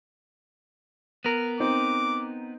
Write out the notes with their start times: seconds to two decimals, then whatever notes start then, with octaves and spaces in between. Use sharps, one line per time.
1.25 B3 A#4
1.60 C4 D#4 D6